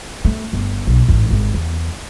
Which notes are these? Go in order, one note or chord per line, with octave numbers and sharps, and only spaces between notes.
A3
G1
B1
A1 G#2
G#1
E2